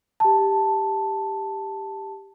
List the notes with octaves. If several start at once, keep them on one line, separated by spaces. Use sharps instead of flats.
G4 A5